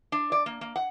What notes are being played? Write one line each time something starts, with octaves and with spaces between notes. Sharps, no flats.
D4
D5
A#3
A#3
F#5